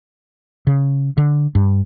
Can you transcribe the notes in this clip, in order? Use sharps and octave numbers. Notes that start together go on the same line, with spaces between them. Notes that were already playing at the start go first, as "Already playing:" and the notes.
C#3
D3
G2